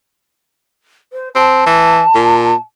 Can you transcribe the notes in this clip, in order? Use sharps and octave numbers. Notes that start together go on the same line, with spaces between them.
C5
C4 A5
E3
A#2